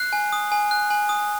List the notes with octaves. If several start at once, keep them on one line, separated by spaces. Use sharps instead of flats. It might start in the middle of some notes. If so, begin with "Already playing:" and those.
Already playing: F#6 C7
G#5
D#6
G#5
F#6
G#5
D#6